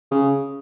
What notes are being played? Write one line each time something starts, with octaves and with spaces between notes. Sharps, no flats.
C#3